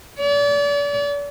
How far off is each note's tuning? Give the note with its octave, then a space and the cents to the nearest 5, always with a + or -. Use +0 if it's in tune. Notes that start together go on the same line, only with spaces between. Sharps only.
D5 -40